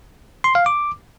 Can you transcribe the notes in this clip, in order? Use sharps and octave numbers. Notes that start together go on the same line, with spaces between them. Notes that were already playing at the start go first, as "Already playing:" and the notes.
C6
F5
D6